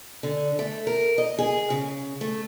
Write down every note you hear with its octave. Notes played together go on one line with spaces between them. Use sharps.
D3
A3
A#4
D#5
G#4
C#3
A3